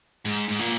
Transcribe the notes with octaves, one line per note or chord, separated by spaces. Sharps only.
G#2
G#2
A#2